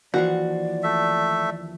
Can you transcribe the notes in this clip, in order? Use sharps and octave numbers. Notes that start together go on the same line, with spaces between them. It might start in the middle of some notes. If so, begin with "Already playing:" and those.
D#2 E3 F3 F#4 D5
A3 E5